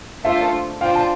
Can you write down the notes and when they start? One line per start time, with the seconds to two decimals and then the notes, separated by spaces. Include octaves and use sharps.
0.24 A3 D4 F4 A4 C5 E5
0.81 D4 F4 C5 F5 G5
0.95 A5